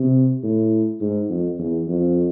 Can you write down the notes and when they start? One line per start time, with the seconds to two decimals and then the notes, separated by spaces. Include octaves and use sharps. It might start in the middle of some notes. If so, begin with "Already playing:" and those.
Already playing: C3
0.43 A2
1.00 G#2
1.30 F2
1.59 E2
1.87 F2